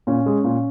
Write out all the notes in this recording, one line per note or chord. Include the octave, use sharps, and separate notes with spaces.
A#2 C#4
G#3
A#2